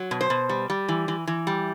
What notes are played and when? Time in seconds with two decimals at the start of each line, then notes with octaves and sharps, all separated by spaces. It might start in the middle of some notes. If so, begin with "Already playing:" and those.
Already playing: F#3
0.11 B2
0.21 C5
0.30 B2
0.49 G3
0.70 G3
0.88 E3
1.08 E3
1.27 E3
1.47 G3